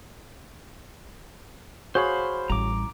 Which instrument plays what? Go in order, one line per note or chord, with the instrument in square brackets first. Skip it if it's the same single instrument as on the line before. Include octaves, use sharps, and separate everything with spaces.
[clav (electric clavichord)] F#4 G#4 C#5 [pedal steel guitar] C5 F5 B5
[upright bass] A1 G3 [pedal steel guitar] A#5 D6